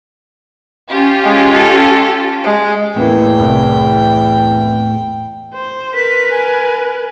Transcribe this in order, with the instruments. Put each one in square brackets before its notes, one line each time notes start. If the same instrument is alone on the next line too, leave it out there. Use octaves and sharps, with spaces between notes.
[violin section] C#4 F4 G4
[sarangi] G#3
A4
G#3
[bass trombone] E2 [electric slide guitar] A2 [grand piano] E3 A#3 B3 [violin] G5
[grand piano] C2
[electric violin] C5
[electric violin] A#4 B4 [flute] B6
[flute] G#5